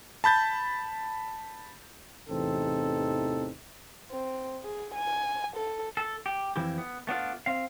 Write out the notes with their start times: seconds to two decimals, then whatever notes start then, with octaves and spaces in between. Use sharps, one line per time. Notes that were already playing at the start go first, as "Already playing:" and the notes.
0.24 A5 B5 G6 A6
2.29 A1 E2 C3 C4 D#4 A4
4.11 C4
4.63 G#4
4.95 G#5
5.56 A4
5.97 A4
6.26 G4
6.56 F2 E3 E4 G4
6.78 B3
7.07 A3 B3 D4 F4
7.46 C4 F5